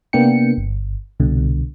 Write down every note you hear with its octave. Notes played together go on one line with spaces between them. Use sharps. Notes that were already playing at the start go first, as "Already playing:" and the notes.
C3 A#3 B3 D4 G5 C#7
G1
C2 B2 D3